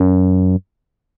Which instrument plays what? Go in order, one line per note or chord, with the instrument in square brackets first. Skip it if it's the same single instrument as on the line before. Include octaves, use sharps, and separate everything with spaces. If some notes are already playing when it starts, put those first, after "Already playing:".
Already playing: [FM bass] F#2